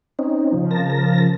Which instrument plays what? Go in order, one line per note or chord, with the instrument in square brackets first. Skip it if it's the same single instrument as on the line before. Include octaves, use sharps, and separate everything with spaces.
[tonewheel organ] C4 C#4 D#4
[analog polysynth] C#3 F3
[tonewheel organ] A#4 A5 A#6